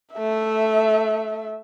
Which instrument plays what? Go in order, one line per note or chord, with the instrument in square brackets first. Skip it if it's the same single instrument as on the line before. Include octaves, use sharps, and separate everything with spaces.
[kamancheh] A3 E5